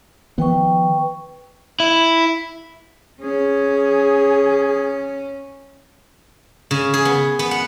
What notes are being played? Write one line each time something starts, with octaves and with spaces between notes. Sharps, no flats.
D#3 F3 B3 B4 G5 C#6
E4
C#4 G#4
C#3
G#4
B3
B3
F#5